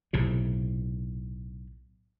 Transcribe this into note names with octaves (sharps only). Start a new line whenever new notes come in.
B1 A2 C3